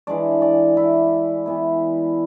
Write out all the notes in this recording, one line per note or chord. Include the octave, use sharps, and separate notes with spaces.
E3 G#3 D4 D5
D5
E4
E3 B3 E4